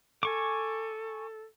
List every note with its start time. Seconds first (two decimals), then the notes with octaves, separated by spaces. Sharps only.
0.23 A4 G#5 C#6 D6